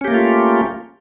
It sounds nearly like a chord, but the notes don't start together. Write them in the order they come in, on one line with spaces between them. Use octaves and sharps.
C#4 G4 A#3 A3 F4